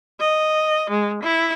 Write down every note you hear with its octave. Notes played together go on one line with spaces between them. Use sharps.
D#5
G#3
E4